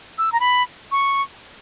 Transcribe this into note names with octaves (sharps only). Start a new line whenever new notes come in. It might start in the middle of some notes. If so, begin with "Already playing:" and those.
E6
A#5
B5
C#6